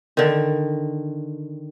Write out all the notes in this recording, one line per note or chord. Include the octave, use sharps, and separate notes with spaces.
D3 D#3